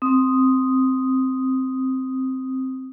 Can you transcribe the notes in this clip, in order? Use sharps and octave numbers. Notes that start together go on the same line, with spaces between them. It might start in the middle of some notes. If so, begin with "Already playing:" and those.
C4 D#6